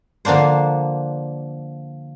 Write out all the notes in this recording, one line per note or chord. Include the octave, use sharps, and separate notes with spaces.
D3 F3 A#3 D4 C5